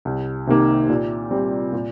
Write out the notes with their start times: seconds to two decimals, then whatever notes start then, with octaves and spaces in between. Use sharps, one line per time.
0.05 C2
0.47 C3 D#3 A#3
0.89 A#2
1.31 G3 C4
1.72 A#2